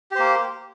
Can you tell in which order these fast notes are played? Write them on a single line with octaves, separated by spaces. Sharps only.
G4 C5 A#3